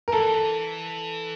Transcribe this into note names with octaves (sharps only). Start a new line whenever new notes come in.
A#4
E3 A4